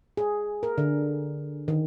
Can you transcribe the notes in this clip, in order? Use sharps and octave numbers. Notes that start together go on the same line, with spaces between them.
G#4
A#4
D3
D#3